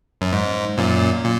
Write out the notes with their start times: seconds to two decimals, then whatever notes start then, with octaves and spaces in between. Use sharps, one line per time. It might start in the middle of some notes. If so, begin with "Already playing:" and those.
0.21 F#2
0.32 G#2
0.78 F#2 A#2
1.24 A#2